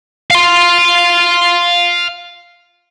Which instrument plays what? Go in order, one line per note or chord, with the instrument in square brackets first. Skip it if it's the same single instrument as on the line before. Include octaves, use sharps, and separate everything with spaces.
[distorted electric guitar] F5 C6